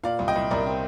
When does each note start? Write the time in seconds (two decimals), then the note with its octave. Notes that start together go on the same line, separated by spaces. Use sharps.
0.04 A#2 D5 F5
0.19 C2
0.28 D#5 G5
0.36 C2
0.51 C2 A#4 D5
0.66 C4